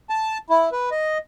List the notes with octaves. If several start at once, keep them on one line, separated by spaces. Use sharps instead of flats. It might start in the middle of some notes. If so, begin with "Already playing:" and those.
A5
E4
B4
D#5